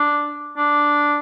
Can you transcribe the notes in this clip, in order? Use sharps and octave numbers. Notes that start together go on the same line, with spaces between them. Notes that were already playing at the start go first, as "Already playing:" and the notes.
Already playing: D4
D4